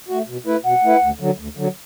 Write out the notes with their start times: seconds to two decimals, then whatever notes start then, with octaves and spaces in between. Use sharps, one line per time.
0.09 A3 F#4
0.27 B2
0.46 A3 E4 B4
0.64 B2 F#5
0.83 A3 E4 B4
1.01 D2
1.20 D3 F#3
1.38 D2
1.57 D3 F#3